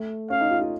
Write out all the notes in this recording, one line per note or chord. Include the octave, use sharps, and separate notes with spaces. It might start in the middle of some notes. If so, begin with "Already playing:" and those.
Already playing: A3
C#4 F5
D#4
F4
F4